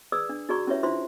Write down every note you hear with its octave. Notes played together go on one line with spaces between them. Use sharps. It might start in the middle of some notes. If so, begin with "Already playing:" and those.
G#4 B4 D5 D#6 E6
D4
D#4 F#4 G#4 D5 A#5 C#6
C#4 E4 G4 B4 C#5 E5
D4 E4 F4 C5 E5 C6